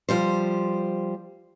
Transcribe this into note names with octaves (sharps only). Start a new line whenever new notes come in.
F3 G3 C5